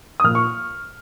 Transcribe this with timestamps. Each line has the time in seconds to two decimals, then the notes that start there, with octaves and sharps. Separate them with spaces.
0.20 D#6
0.24 A#2 F6
0.35 C#6